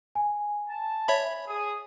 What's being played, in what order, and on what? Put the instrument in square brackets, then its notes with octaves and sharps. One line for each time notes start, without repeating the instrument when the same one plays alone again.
[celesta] G#5
[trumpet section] A5
[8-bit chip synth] C#5 E5 B5
[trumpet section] G#4 D#6